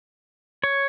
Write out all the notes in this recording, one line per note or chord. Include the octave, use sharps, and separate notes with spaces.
C#5